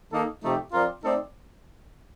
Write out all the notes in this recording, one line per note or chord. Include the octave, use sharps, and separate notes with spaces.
D#3 A#3 D#4 A4
C3 F3 A3 D#4 G4
F3 C4 F4 A#4 D5
A3 C4 D#4 A4 D5